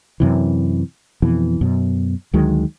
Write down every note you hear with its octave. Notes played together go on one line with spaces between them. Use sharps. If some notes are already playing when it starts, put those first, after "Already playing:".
F#2 C3 E3
F2 B2 E3
F#2 B2
D2 D#3 F#3 G#3